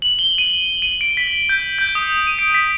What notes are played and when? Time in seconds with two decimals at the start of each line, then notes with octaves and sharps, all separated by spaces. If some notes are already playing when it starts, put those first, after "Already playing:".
0.02 F#7
0.19 G7
0.38 D#7
0.82 D#7
1.01 D7
1.17 B6
1.49 G6
1.79 G6
1.95 D#6
2.27 D#7
2.39 D7
2.54 B6